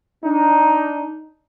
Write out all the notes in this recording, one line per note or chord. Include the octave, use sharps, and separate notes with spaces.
D4 D#4